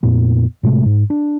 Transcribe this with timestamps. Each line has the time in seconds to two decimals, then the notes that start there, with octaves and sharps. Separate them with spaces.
0.03 F2 A#2 B3
0.63 A2 C3 G#3 A3
0.86 G#2
1.10 D4